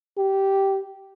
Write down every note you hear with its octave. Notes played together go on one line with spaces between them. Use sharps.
G4